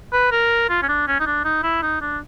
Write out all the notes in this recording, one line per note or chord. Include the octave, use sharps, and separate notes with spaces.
B4
A#4
F4
C#4
D4
C#4
D#4
D4
D#4
E4
D#4
D4